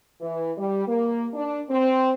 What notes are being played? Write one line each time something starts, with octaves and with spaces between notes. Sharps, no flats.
E3
G3
A#3
D4
C4